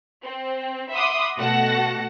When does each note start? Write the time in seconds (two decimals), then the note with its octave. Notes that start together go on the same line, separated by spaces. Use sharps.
0.24 C4
0.92 E5 F#5 B5 C6 D6 D#6
1.38 B2 A3 F#4 F#5 A5 A#6